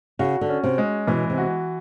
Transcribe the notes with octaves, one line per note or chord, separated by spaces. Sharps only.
C#3 F#4
D3
C#4
C3
G#3
B2 E3
C3
F#4